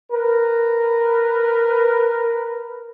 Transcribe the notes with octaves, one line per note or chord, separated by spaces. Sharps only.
A#4 B4